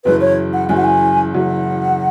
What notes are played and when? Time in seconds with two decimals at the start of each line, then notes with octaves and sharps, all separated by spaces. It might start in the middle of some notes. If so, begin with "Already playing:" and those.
0.04 F#1 F#2 E3 B4
0.21 C#5
0.53 F#5
0.69 F#1 F#2 E3 G#5
0.77 F#5
0.84 G#5
1.34 F#1 F#2 E3 F#5